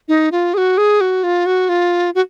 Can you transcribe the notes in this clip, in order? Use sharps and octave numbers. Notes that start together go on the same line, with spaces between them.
D#4
F4
G#4
F#4
G#4
F#4
F4
F#4
F4
F#4